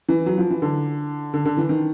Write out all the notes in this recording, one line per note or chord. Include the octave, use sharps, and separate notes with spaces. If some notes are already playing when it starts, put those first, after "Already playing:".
E3
F#3
F3
E3
D3
D3
D3
E3
D#3